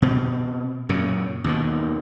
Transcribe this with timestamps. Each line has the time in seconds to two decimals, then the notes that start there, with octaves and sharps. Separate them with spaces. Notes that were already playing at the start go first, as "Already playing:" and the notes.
0.02 B2 C4
0.89 F#2 A#2 C#3
1.44 D#2 B2 D#3